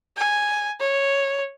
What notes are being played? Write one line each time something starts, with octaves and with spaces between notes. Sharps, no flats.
G#5
C#5